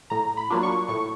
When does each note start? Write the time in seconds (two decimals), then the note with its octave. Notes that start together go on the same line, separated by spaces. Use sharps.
0.10 A2 A#5
0.37 B5
0.50 F#3 A#3 D4 F4
0.63 C#6
0.88 A2 C#6